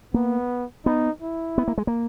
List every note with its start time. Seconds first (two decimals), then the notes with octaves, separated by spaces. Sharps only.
0.14 A#3 B3
0.86 B3 D#4
1.22 E4
1.58 B3
1.68 A#3
1.78 G#3
1.87 A#3